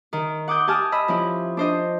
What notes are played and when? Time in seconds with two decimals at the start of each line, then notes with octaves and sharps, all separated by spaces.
0.13 D#3
0.48 F#5 D6 D#6 G6
0.67 G4 G#5 A5 D#6 F6
0.92 D#5 B5 E6
1.08 F3 C#4 E4
1.57 D4 C5 D#5